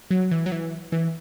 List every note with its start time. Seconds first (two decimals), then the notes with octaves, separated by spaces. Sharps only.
0.11 F#3
0.31 E3
0.46 F#3
0.52 E3
0.92 E3